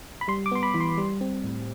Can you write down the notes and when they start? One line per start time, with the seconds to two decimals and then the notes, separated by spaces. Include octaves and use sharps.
0.21 B5
0.28 G3 C6
0.46 D6
0.51 B3 C6
0.63 B5
0.74 E3
0.80 C6
0.98 G3
1.21 C4
1.44 A2